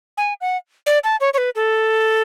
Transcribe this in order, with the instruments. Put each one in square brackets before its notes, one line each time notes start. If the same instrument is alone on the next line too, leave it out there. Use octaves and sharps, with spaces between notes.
[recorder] G#5
F#5
D5
A5
C#5
C#5
B4
A4